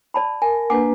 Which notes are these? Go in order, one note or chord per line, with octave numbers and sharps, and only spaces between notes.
D5 A5 B5
A#4 G#5
A#3 D4 B4 F#5 G#5 D6